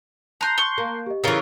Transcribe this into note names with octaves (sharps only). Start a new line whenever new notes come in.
A5 A#5 C6 F#6 G6
C6 C#6
A#3
G4 D#5
C#3 E3 C#4 F4 A#4